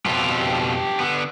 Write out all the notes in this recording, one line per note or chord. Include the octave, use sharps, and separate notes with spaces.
F2 B2 F4 G4 A4
D3 B3